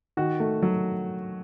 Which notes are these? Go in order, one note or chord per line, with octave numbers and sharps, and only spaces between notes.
D#3 F#4
A3
F#3